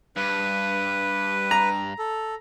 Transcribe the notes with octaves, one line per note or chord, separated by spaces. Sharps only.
G2 B4
A#5
A4